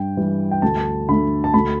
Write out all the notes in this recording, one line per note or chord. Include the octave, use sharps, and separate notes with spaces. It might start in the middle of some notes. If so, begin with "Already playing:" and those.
Already playing: G2 G5
E3 G3
G5
D2 A5
D3 A3 B5
A5
D2 B5